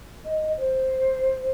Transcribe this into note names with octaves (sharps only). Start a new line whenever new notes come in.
D#5
C5